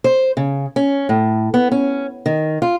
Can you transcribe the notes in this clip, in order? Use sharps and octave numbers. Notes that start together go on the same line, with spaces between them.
C5
C#3
C#4
A2
B3
C#4
D#3
F4